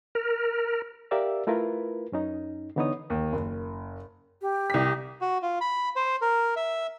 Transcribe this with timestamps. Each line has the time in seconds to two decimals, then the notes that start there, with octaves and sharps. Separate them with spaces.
0.15 A#4
1.11 G4 A#4 D5 E5 F5 E6
1.47 A3 E4 F4 A#4 B4
2.12 F#2 C#4 D#4
2.76 D3 E3 B3 D#4 C#5 D#6
3.10 D#2
3.33 F#1
4.41 G4
4.70 C2 B6
5.21 F#4
5.42 F4
5.61 B5
5.96 C5
6.21 A#4
6.56 E5